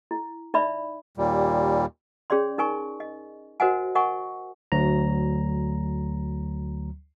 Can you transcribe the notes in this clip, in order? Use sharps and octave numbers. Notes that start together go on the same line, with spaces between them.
E4
D#4 D5 E5 B5
D#2 A#2 G3
C#4 G#4 C#5 D5 C6
D#4 A#4 G#5 C#6
D#5
F#4 A#4 C5 D#5 F#5 G#5
A#4 D#5 F#5 G#5 C#6
D2 F#3 A#5